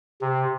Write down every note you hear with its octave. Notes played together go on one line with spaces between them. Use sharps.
C3